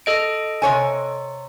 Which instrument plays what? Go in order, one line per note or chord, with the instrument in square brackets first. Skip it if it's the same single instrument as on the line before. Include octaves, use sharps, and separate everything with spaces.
[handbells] A4 D#5 D7
[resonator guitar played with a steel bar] C3 C#5 G#5